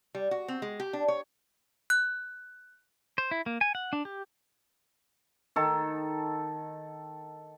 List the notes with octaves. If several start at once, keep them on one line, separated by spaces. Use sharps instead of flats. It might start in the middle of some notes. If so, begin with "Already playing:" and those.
G3
F#4
C4
G#3
G4
D4
C#5
F#6
C5
E4
A#3
G#5
F#5
D4
G4
D#3 A4